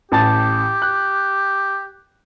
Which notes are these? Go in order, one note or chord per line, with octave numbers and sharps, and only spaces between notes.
A1 G4 A5 A6
F#6